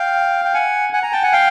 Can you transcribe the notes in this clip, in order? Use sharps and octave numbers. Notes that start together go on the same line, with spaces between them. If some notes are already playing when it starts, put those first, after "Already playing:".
Already playing: F5 G5
G5
F#5 G#5
F#5 G#5
G#5 A#5
G5 A5
F#5 G#5
F5 G5